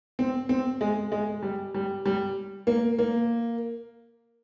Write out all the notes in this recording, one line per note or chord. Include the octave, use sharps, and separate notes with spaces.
C4
C4
G#3
G#3
G3
G3
G3
A#3
A#3